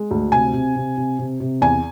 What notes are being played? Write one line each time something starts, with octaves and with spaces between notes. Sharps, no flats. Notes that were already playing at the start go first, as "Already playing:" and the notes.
Already playing: G#3
D2
C3 G#5
C3
C3
C3
C3
C3
E2 G#5